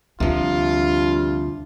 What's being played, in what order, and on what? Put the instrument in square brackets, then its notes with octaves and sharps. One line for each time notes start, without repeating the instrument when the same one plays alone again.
[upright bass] D2 [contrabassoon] G2 [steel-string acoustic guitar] C3 F3 [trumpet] F4